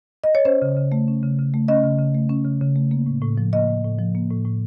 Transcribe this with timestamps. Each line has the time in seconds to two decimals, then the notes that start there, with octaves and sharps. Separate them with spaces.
0.24 D#5
0.35 C#5
0.45 C#4 C5
0.62 C#3
0.77 C#3
0.92 A3
1.08 C#4
1.23 C#3
1.39 C#3
1.54 A3
1.68 C#4 D#5
1.84 C#3
1.99 C#3
2.15 A3
2.30 C#4
2.45 C#3
2.61 C#3
2.76 A3
2.91 A#3
3.06 A2
3.22 A2
3.38 F3
3.53 A#3 D#5
3.68 A2
3.84 A2
3.99 F3
4.15 A#3
4.30 A2
4.45 A2